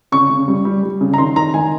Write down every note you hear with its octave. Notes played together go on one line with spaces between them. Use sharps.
C#3 C#6
C#3
G3
G3
G3
C#3
A#5
D#3 C6
D#3 A#5
D#3 G#5